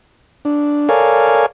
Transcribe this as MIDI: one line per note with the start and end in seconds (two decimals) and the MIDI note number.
0.45 0.89 62
0.89 1.46 69
0.89 1.46 70
0.89 1.46 73
0.89 1.46 74
0.89 1.46 77
0.89 1.46 80